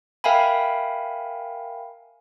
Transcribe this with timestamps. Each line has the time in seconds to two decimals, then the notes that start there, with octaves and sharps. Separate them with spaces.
0.24 A#4 E5 F5 G5 G#5 B5